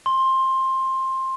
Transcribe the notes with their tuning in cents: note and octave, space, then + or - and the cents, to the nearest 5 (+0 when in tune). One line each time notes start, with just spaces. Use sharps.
C6 +15